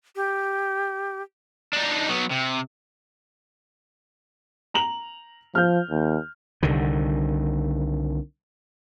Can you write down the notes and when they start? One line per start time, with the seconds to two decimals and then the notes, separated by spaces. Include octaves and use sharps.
0.15 G4
1.73 D4 D#4
2.09 F#3 B3
2.31 C3
4.74 A#5 F7 F#7
5.55 F3 F6 G6
5.90 D#2
6.63 C2 D3 D#3